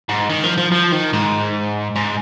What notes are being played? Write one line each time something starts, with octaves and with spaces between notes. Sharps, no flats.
G#2
D#3
F3
F3
F3
D#3
G#2
G#2